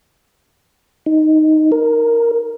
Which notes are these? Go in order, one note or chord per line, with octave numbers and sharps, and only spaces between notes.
D#4
A#4